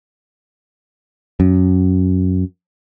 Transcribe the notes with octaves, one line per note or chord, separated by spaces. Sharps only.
F#2